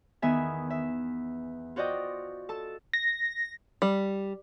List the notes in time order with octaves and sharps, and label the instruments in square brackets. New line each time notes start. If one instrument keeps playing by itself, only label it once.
[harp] E2 D#3 B3 E5 G#5
E5
F4 F#4 C5 D5 D#5 G5
A4 A5
[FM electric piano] A#6
[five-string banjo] G3